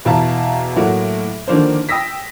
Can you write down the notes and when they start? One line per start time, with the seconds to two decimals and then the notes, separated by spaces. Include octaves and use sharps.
0.05 E2 B2 E4 F5 A5 A#5
0.76 A2 F#3 A3 A#3 F#4
1.48 D3 D#3 F3 A#3 D4 C5
1.89 G5 D#6 E6 A#6 B6